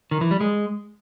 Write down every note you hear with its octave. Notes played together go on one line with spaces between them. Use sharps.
D#3
E3
G3
G#3